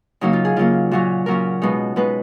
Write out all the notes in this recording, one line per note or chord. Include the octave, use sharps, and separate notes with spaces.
C#3 F#3 A#3 D#4
F4
G#4
C#3 F#3 A#3 F4
A#2 F#3 C#4 F#4
A#2 F#3 C#4 A#4
B2 G#3 B3 D#4
B2 G#3 B3 D#4 B4